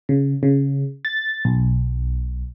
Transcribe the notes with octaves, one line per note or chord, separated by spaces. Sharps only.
C#3
C#3
A6
B1